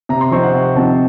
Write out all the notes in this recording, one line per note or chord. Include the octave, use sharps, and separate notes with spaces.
C3 A#5
C6
F3 C4 D#4 C#6
F#5
C3 F#5
F3 C4 D#4 A5